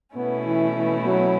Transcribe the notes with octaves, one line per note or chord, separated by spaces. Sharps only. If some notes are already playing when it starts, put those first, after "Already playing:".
B2 A3 B3 C#4 E4
E3
E3
F#3